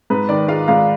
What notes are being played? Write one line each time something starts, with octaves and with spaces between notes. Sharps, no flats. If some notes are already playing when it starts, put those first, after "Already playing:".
G#2 B4
D#3 D5
G#3 F4 F5
G#2 F4 F5